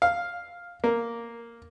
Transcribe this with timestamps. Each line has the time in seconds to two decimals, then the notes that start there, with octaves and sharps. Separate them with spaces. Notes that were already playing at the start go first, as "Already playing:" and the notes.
0.02 F5
0.84 A#3